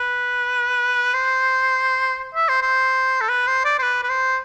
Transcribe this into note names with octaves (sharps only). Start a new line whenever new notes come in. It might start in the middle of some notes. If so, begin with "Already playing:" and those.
Already playing: B4
C5
E5
C5
C5
A4
B4
C5
D5
C5
B4
B4
C5